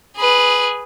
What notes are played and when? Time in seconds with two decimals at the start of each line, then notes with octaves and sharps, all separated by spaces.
0.16 G#4 B4